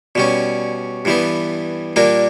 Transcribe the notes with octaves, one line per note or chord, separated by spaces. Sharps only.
B2 G3 C#4 D5
G2 E3 G3 B3
A#2 G3 A#3 D4 A#4 D5